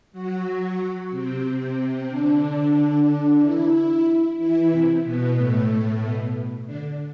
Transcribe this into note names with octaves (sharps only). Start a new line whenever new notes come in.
F#3 F#4
F#3 F#4
C3 C4
C3 C4
D3 D4
D3 D4
E3 E4
E3 E4
C3 C4
B2 B3
A2 A3
B2 B3
D3 D4